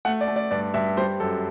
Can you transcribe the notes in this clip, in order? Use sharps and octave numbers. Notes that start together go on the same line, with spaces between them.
A3 F#5
D5
A3
D5
G2 D5
G2 E5
G3 C5
F#2 A4